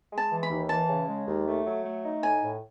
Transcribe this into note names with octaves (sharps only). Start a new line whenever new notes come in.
G#3
A5
E3
B5
D#2
E3 A5
C#3
G#3
D#2
A3
F#3
A3
D#4
A2 G#5
A2